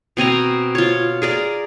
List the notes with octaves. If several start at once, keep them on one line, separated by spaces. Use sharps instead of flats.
B2 C4 G#5 A#5
F4 C#5
G#4 A#4 D5